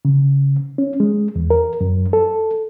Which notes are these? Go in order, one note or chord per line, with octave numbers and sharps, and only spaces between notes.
C#3
C#4
G#3
E2
A#4
F#2
A4